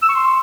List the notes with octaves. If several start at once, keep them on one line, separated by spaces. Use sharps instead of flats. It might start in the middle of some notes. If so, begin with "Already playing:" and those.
E6
C#6
C6